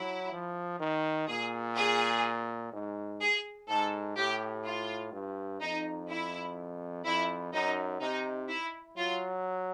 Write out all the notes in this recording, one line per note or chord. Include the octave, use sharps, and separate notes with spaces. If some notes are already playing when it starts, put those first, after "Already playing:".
Already playing: F#3 E4
F3
D#3
A#2 G#4
G#4
G#2
G#4
G#2 A4
A2 G4
F4
G2
F2 D#4
E4
F2 E4
F#2 D#4
C3 D#4
E4
F#3 F4